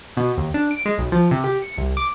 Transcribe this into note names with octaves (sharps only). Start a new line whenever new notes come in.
B2
D#2
D4
D7
G#3
B1
F3
C3
G4
C#7
C2
D6